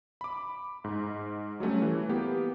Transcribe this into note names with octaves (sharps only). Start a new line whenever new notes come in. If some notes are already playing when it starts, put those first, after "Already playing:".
B5 D6
G#2
F#3 G3 A3 C#4
E3
A#3 B3 G4